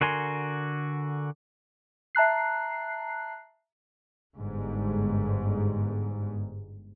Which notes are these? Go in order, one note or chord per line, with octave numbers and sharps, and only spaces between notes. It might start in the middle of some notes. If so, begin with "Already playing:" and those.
D3 F#4 A#4 G#5 C6
E5 A5 A#5 F#6 C7
G1 G#2